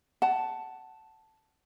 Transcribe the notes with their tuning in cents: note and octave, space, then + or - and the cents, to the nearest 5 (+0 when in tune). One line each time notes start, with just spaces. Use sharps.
F#5 +15 A5 +0